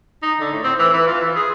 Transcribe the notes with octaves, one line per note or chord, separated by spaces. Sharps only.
D#4
D3
A2
C4
E3
E3
F4
E3
G#4